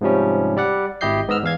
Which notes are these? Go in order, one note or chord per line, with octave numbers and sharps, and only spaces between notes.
G#2 C3 F3 G3 C#4
G3 D5 F#5
G#1 E4 G4 D#5 G6 C7
G#2 B3 D#5 E6 F6
E2 E3 F5 G#6